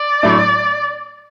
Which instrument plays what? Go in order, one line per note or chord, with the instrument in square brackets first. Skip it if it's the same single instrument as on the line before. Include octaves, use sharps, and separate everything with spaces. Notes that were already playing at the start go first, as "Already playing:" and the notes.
Already playing: [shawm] D5
[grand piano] A2 F#3 A3 D4